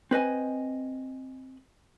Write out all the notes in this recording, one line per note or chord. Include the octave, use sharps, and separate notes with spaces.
C4 B4 D#5 G#5